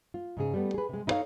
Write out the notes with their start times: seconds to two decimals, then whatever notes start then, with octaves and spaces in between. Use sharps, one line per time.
0.14 F4
0.37 G#2 C#3 G#4
0.54 G3 A3 B3
0.74 G#4 B4
0.89 C3 G#3
1.07 D#4 E4 A4 B4 C#5 F5